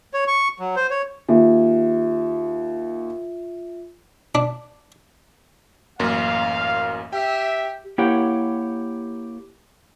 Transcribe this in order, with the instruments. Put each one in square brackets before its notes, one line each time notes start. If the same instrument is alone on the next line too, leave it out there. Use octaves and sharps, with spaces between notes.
[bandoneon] C#5
C#6
F#3
C5
C#5
[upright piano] D#2 [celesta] F4 E5
[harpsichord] D4
[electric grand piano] A1 F#2 A#3 [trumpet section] F5
[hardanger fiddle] G4 [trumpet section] E5 [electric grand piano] G5
[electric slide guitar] A#3 E4 G4 C#5 F#5 G5